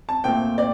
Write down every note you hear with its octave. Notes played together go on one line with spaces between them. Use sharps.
A5
A#2 A3 C4 G5
D5